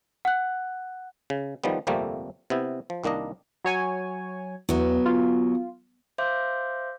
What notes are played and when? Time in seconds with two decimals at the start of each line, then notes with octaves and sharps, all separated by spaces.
0.25 F#5 F#6
1.30 C#3
1.64 D#3 F3 G3 B3
1.87 G1 F2 C3 G3 A3 A#3
2.50 C3 B3 E4
2.90 F3
3.04 C2 D#3 A#3 D4 D#5
3.65 F#3 C#5 G#5
4.69 E2 F#3 B3
5.06 F4
6.18 C5 E5 F5 C6 D6 G6